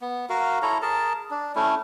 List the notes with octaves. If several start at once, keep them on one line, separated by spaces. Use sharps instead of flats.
B3
F#4 A#4 F5
E4 A4 C#5 A#5
G#4 A#4 A5
D4
A3 C#4 E4